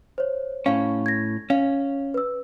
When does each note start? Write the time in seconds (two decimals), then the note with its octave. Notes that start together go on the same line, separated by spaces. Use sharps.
0.18 C5 C#5
0.66 A2 C#4 F5
1.06 G#6 A#6
1.50 C#4 F5
2.14 B4 E6